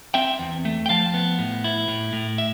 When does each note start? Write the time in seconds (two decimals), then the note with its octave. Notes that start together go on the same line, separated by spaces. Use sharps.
0.14 C4 E5 G5
0.39 E2
0.65 A3
0.86 G5
0.89 F3 F5 A5
1.14 B3
1.39 A2
1.64 E4
1.88 A2
2.13 A2
2.38 E5